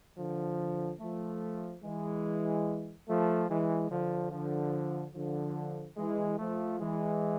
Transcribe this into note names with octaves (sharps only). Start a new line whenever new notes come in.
D3 F3
F3 A3
E3 G#3
F3 A3
E3 G#3
D3 F3
D3 F3
D3 F3
E3 G#3
F3 A3
E3 G#3